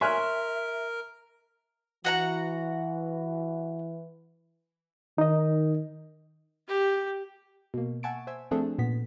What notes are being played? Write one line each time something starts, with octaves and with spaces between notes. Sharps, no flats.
A#4 C#5 E5 G#5 C6 F6 F#6
E3 F#4 F#5 A#5
D#3 D#4 D#5
G4
B2 A#3
E5 F#5 G#5 A5 C#6 D7
C5 E5 G#5
F3 A3 C4 D4 G#4 A4
A#2 B3 B6